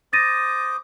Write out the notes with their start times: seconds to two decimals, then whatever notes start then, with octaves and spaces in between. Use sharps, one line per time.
0.13 C5 D6 D#6 A6 A#6 D#7